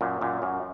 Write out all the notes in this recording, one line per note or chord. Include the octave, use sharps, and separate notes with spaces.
F#2 A#2
F#2 A#2
F#2